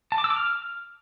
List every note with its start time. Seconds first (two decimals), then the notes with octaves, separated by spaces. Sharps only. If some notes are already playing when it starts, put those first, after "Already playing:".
0.12 A5
0.18 D6
0.24 E6
0.30 D6
0.36 F6